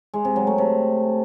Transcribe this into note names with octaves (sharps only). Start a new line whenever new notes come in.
G#3
C3
F#3
A3
C3